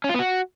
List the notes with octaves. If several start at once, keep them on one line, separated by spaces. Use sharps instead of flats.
C#4
F4
B3
F#4